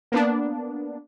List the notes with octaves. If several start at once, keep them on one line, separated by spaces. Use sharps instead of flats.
A#3 B3 D4